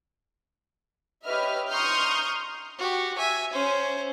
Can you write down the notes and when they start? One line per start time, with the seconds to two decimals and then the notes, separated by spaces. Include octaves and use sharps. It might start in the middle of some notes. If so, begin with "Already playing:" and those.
1.24 G4 B4 C#5 D#5 E5 F6
1.70 A#5 C6 C#6 D#6 F6 G6
2.79 F#4 G4
3.18 E5 G#5
3.53 C#4 C5